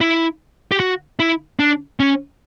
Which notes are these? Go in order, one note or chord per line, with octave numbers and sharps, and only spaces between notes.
E4
G4
F#4
E4
D4
C#4